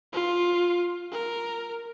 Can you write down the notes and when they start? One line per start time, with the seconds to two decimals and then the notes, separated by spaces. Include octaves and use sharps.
0.13 F4
1.12 A#4